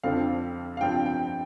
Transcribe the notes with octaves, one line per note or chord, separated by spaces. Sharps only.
F2 D3 F3 C4 F5
F5
G2 F3 C4 G5
G5